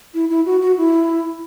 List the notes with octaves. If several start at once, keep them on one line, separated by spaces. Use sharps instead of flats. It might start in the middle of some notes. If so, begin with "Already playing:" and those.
E4
E4
F#4
F#4
E4